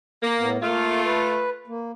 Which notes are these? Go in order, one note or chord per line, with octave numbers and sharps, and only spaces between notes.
A#3
A2 B3
A3 A#3 F4 F5
B4
A#3